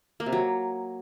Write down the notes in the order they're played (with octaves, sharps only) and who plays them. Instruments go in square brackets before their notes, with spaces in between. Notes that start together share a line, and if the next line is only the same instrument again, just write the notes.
[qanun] A#3
C3
F#3